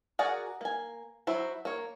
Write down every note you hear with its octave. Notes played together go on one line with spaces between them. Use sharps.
F#4 G#4 A#4 D5 F#5
A#3 G#5
F#3 E4 F#4 C5
A#3 C#5